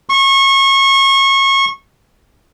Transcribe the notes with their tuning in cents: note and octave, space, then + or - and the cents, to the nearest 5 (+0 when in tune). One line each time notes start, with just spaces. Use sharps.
C#6 -25